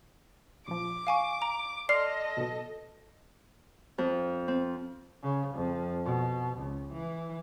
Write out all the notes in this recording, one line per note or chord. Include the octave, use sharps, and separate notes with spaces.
A#1 F3 D6
F5 G#5 C#6
A#5
A4 D5 D#5 C6 F6 C7
B1 B2
F2
C4
C#3
F2
B2
C#2
E3